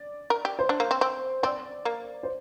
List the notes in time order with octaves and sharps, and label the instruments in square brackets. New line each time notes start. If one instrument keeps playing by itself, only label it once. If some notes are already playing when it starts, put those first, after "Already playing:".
Already playing: [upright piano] D5
[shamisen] A#4
G4
[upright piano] C5
[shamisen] D4
A#3
C4
C4
[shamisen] C4 [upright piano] D5
[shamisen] A#3
[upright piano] C5